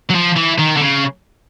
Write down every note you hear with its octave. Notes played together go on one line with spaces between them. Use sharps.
F#3
F3
E3
D#3
D3
C#3